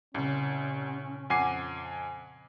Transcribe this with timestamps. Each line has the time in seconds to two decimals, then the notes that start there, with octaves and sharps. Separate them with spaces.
0.15 C2 A#2 C#3 C#4
1.30 F2 F#5 G#5 D6 C7